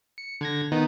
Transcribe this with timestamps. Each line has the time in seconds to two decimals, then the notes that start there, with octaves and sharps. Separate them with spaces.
0.18 C#7
0.41 D3 G#6 A#6
0.72 D#3 B3 D#4